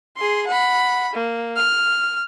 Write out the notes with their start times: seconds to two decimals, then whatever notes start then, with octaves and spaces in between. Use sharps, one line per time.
0.17 G#4 C6
0.47 F#5 B5
1.13 A#3
1.56 F6